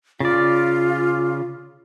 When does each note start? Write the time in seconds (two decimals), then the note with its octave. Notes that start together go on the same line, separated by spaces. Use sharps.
0.20 C#3 F4 D5